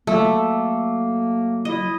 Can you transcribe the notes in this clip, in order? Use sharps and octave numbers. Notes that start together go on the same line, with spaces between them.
F#3 A3 A#3
E4 D#5